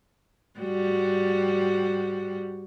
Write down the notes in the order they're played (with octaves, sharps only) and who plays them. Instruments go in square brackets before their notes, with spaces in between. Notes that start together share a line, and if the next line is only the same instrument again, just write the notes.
[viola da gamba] G#2 G3 F#4